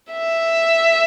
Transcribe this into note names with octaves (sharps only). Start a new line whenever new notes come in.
E5